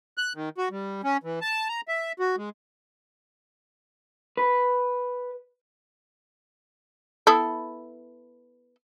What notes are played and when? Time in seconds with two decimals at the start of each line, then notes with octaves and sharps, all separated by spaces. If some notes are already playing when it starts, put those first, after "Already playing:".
0.18 F#6
0.35 D#3
0.58 F#4
0.71 G3
1.04 C#4
1.23 E3
1.41 A5
1.69 A#5
1.88 E5
2.19 F#4
2.37 G#3
4.37 B4
7.27 B3 E4 A4